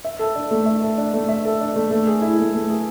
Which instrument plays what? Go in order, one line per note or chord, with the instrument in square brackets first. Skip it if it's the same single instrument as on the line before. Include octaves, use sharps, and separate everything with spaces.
[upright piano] E5
A4
D4
A3
E5
A4
D4
A3
E5
A4
D4
A3
A3
G#4
E4
A3
A3
G#4